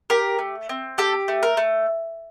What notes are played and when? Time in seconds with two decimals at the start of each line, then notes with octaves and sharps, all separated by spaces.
0.10 G4 A#4
0.39 A3
0.69 C4
0.98 G4 A4
1.28 A3
1.43 A#4
1.57 A3